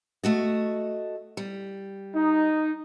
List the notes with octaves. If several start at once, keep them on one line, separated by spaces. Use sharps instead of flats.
A3 F#4 D#5
G3
D#4